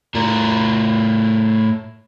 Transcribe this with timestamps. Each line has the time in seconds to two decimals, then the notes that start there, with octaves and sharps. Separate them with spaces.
0.15 A2 A#4